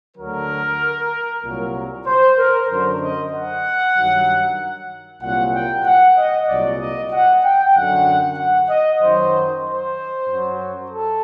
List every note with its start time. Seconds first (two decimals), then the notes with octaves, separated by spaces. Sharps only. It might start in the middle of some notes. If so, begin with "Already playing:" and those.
0.17 D2 D3 F#3 A#4
1.43 C2 A#2 F#3
2.06 C5
2.38 A#4
2.69 F#2 D3 F#3 C5
3.01 D#5
3.33 F#5
3.96 G2 D#3 F#3
5.22 C2 A#2 F#3 F#5
5.54 G5
5.86 F#5
6.17 D#5
6.48 C2 A#2 F#3 D5
6.80 D#5
7.12 F#5
7.44 G5
7.75 F#2 D3 F#3 F#5
8.38 F#5
8.69 D#5
9.02 F#2 D#3 F#3 C5
9.64 C5
10.27 F#2 F#3
10.91 A4